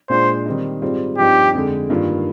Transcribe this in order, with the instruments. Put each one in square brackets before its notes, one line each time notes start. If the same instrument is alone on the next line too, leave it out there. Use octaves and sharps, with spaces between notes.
[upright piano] A#2 G#3 D4 F4 [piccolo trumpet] C5
[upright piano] D#3 G3 C4 D#4
G#2 G3 C4 F4
[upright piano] G2 F3 C4 D#4 [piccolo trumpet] G4
[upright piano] F2 D3 G#3
G2 D#3 A#3 F4